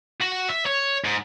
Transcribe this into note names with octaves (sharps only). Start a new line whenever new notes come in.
F#4
E5
C#5
G#2